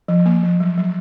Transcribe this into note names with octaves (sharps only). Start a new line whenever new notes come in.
F3
A#3
F3
F#3
F#3